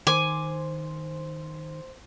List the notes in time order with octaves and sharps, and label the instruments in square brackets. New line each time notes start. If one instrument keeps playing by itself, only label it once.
[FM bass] D#3 [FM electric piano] C5 C6 [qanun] G#5 [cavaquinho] D6